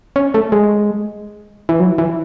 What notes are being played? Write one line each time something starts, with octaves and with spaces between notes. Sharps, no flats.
C#4
A3
G#3
E3
F#3
E3